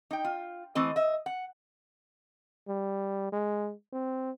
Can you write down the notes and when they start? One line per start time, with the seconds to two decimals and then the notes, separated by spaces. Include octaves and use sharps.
0.11 D#4 G5
0.25 F4
0.75 E3 A3 C4 D#5
0.96 D#5 E5
1.26 F#5
2.68 G3
3.32 G#3
3.93 C4